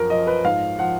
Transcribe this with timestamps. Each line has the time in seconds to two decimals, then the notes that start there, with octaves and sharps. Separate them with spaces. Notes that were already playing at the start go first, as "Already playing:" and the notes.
Already playing: F#2 F3 A#4
0.10 F3 D#5
0.27 B4
0.44 G#2 F5
0.79 F3 F#5